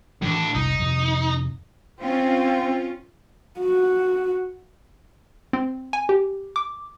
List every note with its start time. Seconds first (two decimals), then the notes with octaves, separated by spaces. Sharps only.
0.22 A2 D#3 E3 G3 D4
0.55 F1 C2 D#4
0.79 F2 C3 D#3
2.01 C4 C#4 F4
3.60 F#4
5.53 C4
5.93 G#5
6.09 G4
6.56 D6